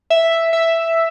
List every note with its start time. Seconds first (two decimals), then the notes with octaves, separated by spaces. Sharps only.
0.10 E5
0.53 E5